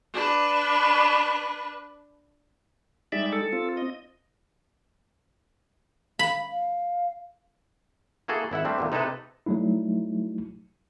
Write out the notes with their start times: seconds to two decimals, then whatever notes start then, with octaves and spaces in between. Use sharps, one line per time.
0.14 D4 B4
3.12 G3 G#3 D#4 D5 E5
3.33 A4
3.53 C4 F4
3.77 D#5
6.19 F5 B5
6.51 F5
8.28 A#3 E4 F#4 G#4 A4
8.51 G#1 E4 E5 F#5
8.65 G3 A3 C4 D4
8.78 E2 A#2 D3
8.92 C3 D#4 E4 A4 B4
9.46 F#3 G3 A3 D#4 E4